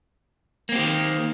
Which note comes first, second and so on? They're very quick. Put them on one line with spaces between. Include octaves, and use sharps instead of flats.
A#3 C4 G4 D#3